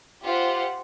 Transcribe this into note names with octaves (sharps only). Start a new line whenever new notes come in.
F4 G4 C5 F#5